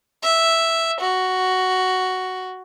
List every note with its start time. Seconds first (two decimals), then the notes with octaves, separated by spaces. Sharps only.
0.23 E5
1.01 F#4